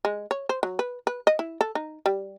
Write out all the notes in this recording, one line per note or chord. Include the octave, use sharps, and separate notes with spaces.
G#3
C#5
C5
F#3
B4
B4
D#5
E4
A4
D#4
G3